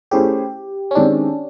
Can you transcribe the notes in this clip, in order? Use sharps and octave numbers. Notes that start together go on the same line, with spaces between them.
A3 C#4 E4 G4 G#4 C5
C#4
D#3 G#3 C4 D4